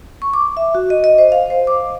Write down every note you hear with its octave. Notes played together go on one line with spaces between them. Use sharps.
C#6
D6
E5
F#4
D#5
D#5
C5
F5
C5
D6